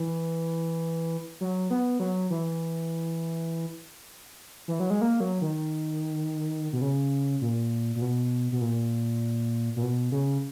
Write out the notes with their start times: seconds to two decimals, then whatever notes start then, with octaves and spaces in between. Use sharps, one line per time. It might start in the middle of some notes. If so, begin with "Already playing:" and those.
Already playing: E3
1.41 F#3
1.70 B3
2.00 F#3
2.30 E3
4.68 E3
4.80 F#3
4.90 G#3
5.01 A#3
5.20 F#3
5.42 D#3
6.73 B2
6.81 C#3
7.41 A#2
7.96 A#2
8.02 B2
8.52 B2
8.61 A#2
9.76 A#2
9.82 B2
10.12 C#3